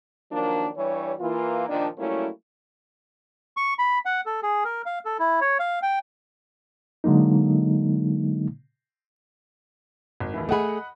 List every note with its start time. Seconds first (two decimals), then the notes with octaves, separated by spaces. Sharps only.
0.32 D#3 F3 F#3 A#3 D4
0.77 G2 E3 G3 C#5
1.19 E3 A#3 F4
1.69 A#2 D#3 F3 D4
1.98 F#3 G3 A3 A#3 C#4 E4
3.57 C#6
3.79 B5
4.05 F#5
4.26 A4
4.43 G#4
4.64 A#4
4.86 F5
5.05 A4
5.19 E4
5.41 C#5
5.59 F5
5.82 G5
7.04 D3 F#3 G#3 A#3 D#4
10.20 G#1
10.34 D#2 A2 E3
10.49 A3 G#4 D#5 F#5 B5